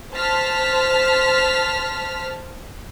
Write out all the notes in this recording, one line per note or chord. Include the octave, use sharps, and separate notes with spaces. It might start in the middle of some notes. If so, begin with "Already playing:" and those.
C5 A5 F6 B6